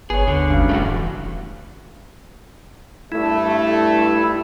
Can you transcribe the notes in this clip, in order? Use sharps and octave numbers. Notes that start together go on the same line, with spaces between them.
G1 B3 G#4 C#5
D#2 D3
G1 G2 C#3 F#3
D#1 A3 E4 F#4
E2
G2 A3 E4